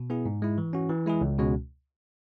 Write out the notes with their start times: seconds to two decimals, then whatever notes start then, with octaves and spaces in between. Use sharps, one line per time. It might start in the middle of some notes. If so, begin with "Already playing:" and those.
Already playing: B2
0.10 B3 E4 G#4
0.26 G#2
0.42 G#3 E4
0.58 E3
0.73 C#4 F#4
0.89 E3
1.06 G#3 E4 G#4
1.21 C#2
1.38 B2 G#3 C#4 F#4